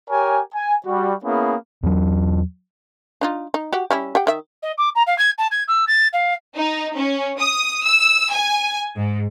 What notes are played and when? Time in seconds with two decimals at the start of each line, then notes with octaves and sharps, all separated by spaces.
0.10 G4 A#4 C#5 G#5
0.55 G#5
0.86 G3 F#4
1.25 A#3 B3 C#4 E4 G#4
1.83 E2 F#3
3.21 D4 D#4 F4
3.54 D#4
3.73 F#4 G4 F#5
3.91 G3 C#4 E4
4.15 G4 F#5 G5
4.27 D#3 E5
4.62 D#5
4.78 D6
4.95 A#5
5.07 F5
5.18 G#6
5.38 A5
5.51 G#6
5.68 E6
5.87 A6
6.13 F5
6.57 D#4
6.97 C#4
7.39 D#6
7.84 E6
8.32 G#5
8.96 G#2